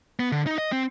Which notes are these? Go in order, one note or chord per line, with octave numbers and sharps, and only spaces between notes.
B3
D3
D#4
D#5
C4